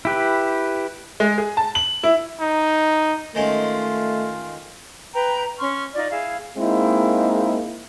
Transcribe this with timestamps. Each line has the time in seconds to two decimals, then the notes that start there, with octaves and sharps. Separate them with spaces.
0.05 E4 G4 B4
1.20 G#3
1.38 G#4
1.57 A5
1.75 F#7
2.03 E4
2.40 D#4
3.35 D#3 G#3 A3 C#4 F4
5.14 B4 G5 A#5
5.59 C#4 C6 C#6 F6
5.95 D#4 F4 D5
6.11 E4 G#4 F5
6.57 G#3 A#3 C4 D#4 E4